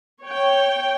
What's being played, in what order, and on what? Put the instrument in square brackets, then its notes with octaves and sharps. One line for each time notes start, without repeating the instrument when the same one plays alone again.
[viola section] C#5 G5